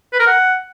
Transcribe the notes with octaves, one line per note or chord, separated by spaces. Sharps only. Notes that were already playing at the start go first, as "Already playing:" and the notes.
B4
A#4
F#5